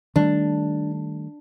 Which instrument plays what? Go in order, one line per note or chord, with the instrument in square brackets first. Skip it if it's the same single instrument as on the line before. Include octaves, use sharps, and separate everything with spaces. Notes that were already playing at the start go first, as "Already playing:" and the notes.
[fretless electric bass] D#3 G3 A3 [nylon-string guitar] D4